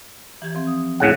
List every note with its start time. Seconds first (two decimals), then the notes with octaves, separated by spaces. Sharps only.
0.42 E3 G4 G#6
0.55 F3 C4
0.67 D#6
1.00 A2 C#3 F#5